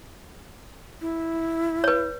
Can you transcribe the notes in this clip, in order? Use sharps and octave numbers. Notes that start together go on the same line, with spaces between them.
E4
B4 C#5